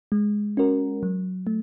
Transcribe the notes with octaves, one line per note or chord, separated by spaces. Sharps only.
G#3
C#4 F#4 A#4
F#3
A3